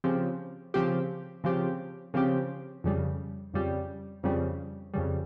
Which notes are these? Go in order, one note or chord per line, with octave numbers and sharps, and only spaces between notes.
C#3 F3 C4 G4
C#3 F3 C4 G4
C#3 F3 C4 G4
C#3 F3 C4 G4
F2 C#3 G3
F2 C#3 G3
F2 C#3 G3
F2 C#3 G3